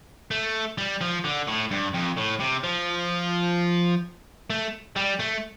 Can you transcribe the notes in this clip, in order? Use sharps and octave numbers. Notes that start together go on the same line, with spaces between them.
A3
G3
F3
D3
A2
G2
F2
A2
C3
F3
A3
G3
A3